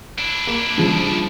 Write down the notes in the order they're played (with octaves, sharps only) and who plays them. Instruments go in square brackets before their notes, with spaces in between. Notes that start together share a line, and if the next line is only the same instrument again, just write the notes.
[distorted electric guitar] D4 E4
[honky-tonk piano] A#3 E7
G2 C#3 F3